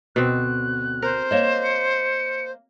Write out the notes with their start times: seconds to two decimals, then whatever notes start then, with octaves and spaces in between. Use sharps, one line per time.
0.16 D2 B2 C4 F#6
1.02 A#4 C5
1.31 A#3 C#5 D#5 E7
1.64 C#7